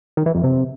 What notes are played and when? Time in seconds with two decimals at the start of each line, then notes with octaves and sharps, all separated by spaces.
0.17 D#3
0.26 E3
0.35 F2
0.43 C3